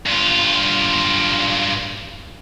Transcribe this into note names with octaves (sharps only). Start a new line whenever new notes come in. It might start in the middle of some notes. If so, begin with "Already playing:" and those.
G2 F4